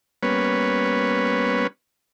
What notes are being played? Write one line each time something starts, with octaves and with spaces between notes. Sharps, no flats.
G3 A#3 B3 C#4 B4 C#5